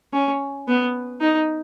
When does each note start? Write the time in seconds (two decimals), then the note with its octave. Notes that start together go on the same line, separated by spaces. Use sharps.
0.13 C#4
0.68 B3
1.21 D#4